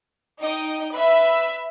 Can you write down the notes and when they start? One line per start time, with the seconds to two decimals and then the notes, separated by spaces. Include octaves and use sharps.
0.41 D#4 D#5 G5
0.92 B4 E5